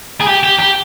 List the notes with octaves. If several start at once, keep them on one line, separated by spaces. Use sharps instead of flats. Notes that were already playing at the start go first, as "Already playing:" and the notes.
G#4
G4
G4
G4